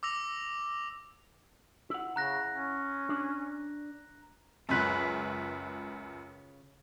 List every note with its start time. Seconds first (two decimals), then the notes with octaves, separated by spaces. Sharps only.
0.03 D6 E6 A#6 F7
1.90 E4 F#5
2.16 C#3 A#5 F#6 A#6
2.51 C#4
3.09 D4
4.69 C#2 F#2 C#3 B4